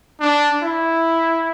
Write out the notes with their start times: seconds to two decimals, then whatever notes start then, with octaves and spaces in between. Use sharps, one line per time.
0.20 D4
0.62 E4